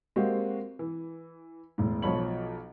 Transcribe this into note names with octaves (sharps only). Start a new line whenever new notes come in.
G#3 A#3 C4 F#4 G4
E3
E1 A2
B1 F3 C#5 B5 F#7